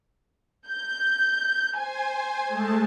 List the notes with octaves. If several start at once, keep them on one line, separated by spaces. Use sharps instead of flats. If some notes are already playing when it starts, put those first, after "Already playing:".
G6
C5 G#5
G#3 A3 A5